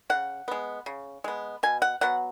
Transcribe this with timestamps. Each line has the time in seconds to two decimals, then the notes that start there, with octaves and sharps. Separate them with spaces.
0.10 C#3 F#5
0.48 G#3 B3
0.86 C#3
1.24 G#3 B3
1.63 B2 G#5
1.82 F#5
2.01 F#3 B3 F#5